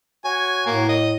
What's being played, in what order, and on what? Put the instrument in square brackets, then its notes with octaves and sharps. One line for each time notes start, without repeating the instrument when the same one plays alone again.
[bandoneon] F#4 C#5 [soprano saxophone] G#5
[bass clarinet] A2 [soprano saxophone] A#3
[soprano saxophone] D#5